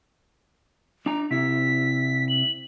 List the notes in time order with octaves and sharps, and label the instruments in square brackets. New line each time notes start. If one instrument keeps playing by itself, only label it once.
[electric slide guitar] D4 A#5
[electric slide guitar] C3 E4 [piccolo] B6
[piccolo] F#7